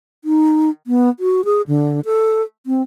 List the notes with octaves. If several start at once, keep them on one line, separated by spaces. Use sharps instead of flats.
D#4
B3
F#4
G#4
D3
A4
C4